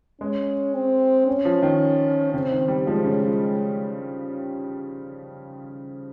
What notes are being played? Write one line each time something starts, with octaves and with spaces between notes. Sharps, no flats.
G#3 C#4
C4
C#4
F3
D#3
C#3 C4
D#3
G3
F3 G#3
C#3
F3